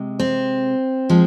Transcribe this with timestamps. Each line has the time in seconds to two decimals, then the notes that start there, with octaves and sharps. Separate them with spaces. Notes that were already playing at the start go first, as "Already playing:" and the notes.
Already playing: C3 G#3
0.19 C4
1.09 F3 G#3